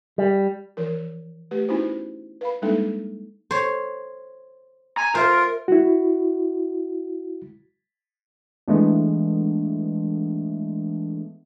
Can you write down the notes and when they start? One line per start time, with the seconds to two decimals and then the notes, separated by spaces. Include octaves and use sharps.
0.18 G3
0.77 E3 F3 A#4
1.51 A3 G4 B4
1.68 B3 C#4 D#4 E4 F#4 C5
2.41 B4 F5 B5
2.62 G3 G#3 A#3 D4 D#4 A4
3.51 C5 C#5
4.97 G#5 A#5
5.15 F4 A#4 C5 E5
5.68 E4 F#4
8.68 E3 G#3 A3 B3 D4